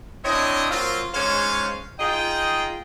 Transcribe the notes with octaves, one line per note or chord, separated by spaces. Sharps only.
C4 D4 E4 C#5 D#5
F#3 A#3 C4 F4
G#2 G#3 C#4 C5 C#5 F5
D#4 F4 G#4 D#5 G5